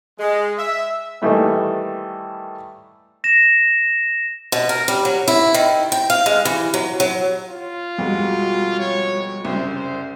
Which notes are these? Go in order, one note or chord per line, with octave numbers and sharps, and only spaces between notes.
G#3
E5
D#3 E3 G3 A3 B3
A#6 E7
B2
A#4
G3
F#3
E4
D#3
G5
F5
G#3
E3
F#3
F#3
F4
F2 B2 G3 G#3 F#4
C#5
F#1 C2 C5
C5